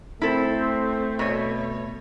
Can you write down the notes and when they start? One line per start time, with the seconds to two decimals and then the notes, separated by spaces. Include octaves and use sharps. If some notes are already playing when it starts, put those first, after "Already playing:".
0.22 A3 C4 E4 A4
1.19 B2 C#5